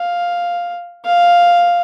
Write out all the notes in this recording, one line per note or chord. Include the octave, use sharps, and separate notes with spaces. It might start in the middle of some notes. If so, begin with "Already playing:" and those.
Already playing: F5
F5